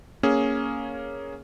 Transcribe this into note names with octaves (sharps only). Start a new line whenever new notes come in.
A#3 C#4 G#4